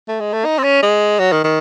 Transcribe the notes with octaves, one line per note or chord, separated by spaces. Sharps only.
A3
G#3
A3
D#4
C4
C#4
G#3
F#3
D#3
D#3